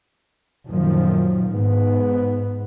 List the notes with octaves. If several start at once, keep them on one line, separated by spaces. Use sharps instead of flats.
F#2 A#2 D#3 F3
G#2 B3